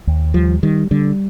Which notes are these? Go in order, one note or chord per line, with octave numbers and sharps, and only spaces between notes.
D#2
F3 G3
D#3 G3
D3 G3